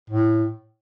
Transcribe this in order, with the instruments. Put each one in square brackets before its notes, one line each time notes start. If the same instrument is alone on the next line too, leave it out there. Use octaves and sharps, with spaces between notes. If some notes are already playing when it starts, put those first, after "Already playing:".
[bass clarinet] A2